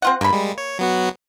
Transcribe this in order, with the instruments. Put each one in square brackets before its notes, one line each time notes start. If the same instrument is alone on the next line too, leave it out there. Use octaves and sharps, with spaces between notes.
[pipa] C4 F4 F#5
[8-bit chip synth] G2 [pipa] A#3 B5
[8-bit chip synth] G3 G#3
C#5
F#3 B3 F#4